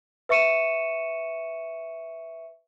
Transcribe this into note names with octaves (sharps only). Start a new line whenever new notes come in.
B4 E5 C#6 C#7 D#7 E7